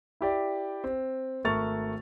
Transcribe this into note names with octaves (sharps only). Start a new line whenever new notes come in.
E4 G4 D5
C4
G#1 A3 A#4 C#6 A6 F7